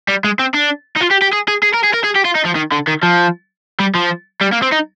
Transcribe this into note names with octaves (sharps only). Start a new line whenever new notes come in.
G3
G#3
C4
D4
D#4
F4
G4
G4
G#4
G#4
G#4
A#4
G#4
A#4
G#4
G4
F4
D#4
F3
D#3
D3
D#3
F3
G3
F3
G3
A#3
C4
D#4